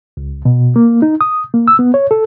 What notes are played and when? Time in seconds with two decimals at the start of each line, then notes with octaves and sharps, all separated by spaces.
0.17 C#2
0.45 B2
0.76 A#3
1.02 D#4
1.21 D#6
1.54 A#3
1.68 E6
1.79 B3
1.94 C#5
2.11 A4